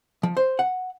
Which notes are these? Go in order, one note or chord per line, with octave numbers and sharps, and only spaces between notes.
F3
C5
F#5